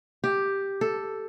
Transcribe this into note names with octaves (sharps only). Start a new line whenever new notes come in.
G4
A4